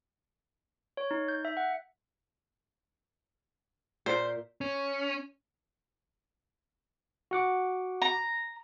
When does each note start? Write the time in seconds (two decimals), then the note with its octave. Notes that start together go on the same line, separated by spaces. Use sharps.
0.97 C#5
1.11 D#4
1.28 G6
1.45 E5
1.57 F#5
4.06 A#2 A#4 C5 E5
4.61 C#4
7.31 F#4 F#5 D6
8.02 A#5